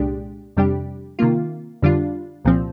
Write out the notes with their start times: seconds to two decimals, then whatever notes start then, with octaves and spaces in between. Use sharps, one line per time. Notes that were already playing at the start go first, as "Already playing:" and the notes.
Already playing: C2 A#2 G#3 D4 G4
0.57 F2 C3 G3 D4 G4
1.19 C3 D#3 A#3 F4
1.82 F2 D3 G3 D4 F4
2.45 C2 A#2 F3 C4